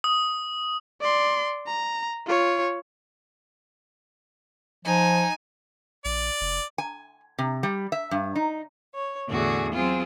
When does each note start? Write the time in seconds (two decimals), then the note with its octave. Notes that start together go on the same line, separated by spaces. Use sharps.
0.04 D#6
1.01 D5 C6
1.67 A#5
2.27 F4 C#5
4.85 F3 D#4 G#5
6.05 A#1 D5
6.41 F1
6.78 G#5
7.39 C3
7.63 G3
7.92 E5
8.11 G2
8.36 D#4
8.93 C#5
9.29 E2 A2 D3 F#4 G#4
9.73 F#3 C4 F4 G#4